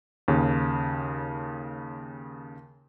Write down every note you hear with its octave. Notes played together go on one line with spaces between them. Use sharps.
D#2 C#3